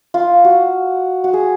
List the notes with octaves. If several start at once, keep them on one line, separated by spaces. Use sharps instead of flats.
F4
F#4
F#4
G#4